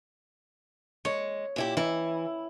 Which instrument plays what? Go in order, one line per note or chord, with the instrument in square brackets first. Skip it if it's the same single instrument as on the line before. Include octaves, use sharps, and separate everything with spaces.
[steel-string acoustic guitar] G#3 [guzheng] C#5
[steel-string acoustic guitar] A#2 E4 G4
[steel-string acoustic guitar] E3 [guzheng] E4